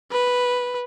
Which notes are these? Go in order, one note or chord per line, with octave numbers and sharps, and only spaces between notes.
B4